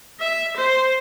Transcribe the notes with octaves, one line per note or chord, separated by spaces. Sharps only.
E5
C5